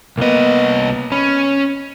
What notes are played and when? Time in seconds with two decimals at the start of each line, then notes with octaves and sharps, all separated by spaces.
0.17 C2 A#3 B3 D#5
1.12 C#4 B5